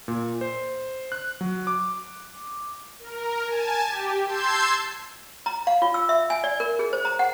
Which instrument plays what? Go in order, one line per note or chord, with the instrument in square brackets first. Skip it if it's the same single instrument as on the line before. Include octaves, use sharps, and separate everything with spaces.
[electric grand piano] A#2
C5
F#6
F#3
D6
[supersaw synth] A#4
G#5 A5
G4
A5 C6 E6 G6 G#6 C7
[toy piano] A#5
F5
F4
E6
E5
G#5
D5
A#4
G#4
C5
A#5
F#5